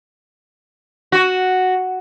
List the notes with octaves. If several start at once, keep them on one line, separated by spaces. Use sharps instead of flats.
F#4